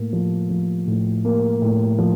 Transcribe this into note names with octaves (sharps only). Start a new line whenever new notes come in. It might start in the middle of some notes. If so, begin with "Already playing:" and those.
Already playing: A2 A#3
F3
F3
A2
A#3
A2
F3